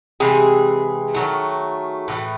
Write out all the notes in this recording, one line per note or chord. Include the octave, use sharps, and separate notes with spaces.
C3 E3 G#3 G#4
D#3 F#3 A3
A2 E3 A3